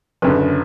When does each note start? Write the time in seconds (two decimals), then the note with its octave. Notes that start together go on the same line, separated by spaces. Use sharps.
0.22 F#1 F#2 D3 B4